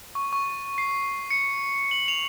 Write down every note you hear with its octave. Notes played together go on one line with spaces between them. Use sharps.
C#6
C#6
C7
C#7
F#7
F7